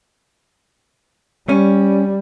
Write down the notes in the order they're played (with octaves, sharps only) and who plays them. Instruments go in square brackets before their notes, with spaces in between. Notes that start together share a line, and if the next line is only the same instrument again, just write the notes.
[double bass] G3 [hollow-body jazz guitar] C#4